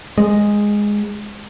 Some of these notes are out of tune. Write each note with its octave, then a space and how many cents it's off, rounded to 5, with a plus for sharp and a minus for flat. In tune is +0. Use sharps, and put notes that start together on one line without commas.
G#3 -5